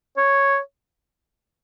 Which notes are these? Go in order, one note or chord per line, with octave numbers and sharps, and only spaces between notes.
C#5